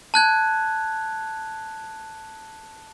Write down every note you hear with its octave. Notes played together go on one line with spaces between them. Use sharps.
A5 F#6 G#6